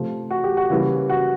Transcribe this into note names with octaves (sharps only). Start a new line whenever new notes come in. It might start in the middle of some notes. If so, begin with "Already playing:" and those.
Already playing: C3 F3 A3
F#4
G4
F#4
C#3 E3 G3 A#3
F#4